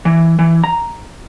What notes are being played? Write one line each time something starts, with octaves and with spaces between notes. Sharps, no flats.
E3
E3
A#5